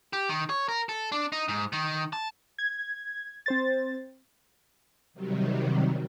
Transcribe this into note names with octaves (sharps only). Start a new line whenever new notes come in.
G4
D#3
C#5
A#4
A4
D4
D#4
G#2
D#3
A5
G#6
C4 C5 A6
C3 D#3 F#3 G3